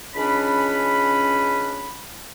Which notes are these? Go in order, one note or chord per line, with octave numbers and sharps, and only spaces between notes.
C#2 C#4 D4 B5